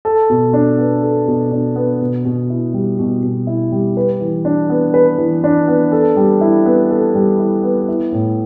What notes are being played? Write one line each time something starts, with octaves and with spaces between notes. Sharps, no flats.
A4
B2
D4
B3
A4
B2
D4
B3
B2
B2
E4
G3
B2
B2
E4
G3
B4
E3
D4
B3
B4
E3
D4
B3
A4
G3
E4
B3
A4
G3
E4
B3
E4
A2